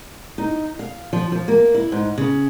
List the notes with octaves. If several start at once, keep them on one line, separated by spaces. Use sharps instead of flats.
D#4
F5
F3
F3
A#3
E4
G#2
C#3